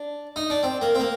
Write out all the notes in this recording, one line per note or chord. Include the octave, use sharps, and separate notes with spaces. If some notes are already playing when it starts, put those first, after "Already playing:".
Already playing: D4
D#4
D4
C4
A#3
C4
A#3